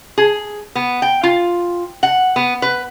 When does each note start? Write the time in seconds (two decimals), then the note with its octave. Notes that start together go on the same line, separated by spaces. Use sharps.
0.18 G#4
0.75 B3
1.02 G5
1.23 F4
2.03 F#5
2.36 B3
2.62 B4